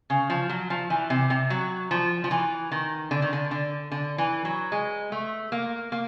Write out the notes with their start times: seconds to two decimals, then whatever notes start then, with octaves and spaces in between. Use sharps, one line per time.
0.10 C#3
0.30 F3
0.49 F#3
0.70 F3
0.90 E3
1.10 C3
1.30 C3
1.50 F#3
1.91 F3
2.24 F3
2.31 E3
2.72 D#3
3.11 D3
3.22 D#3
3.33 D3
3.51 D3
3.92 D3
4.18 E3
4.45 F#3
4.72 G#3
5.12 A3
5.52 A#3
5.92 A#3